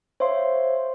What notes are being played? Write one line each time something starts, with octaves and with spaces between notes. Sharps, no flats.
C5 C#5 E5 F5 C6